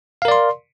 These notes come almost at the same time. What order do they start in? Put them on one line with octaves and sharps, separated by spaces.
F5 A#4 D5 C6